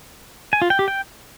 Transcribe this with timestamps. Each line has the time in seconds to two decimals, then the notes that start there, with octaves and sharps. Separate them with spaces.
0.53 G#5
0.62 F4
0.70 G5
0.79 G4
0.88 G5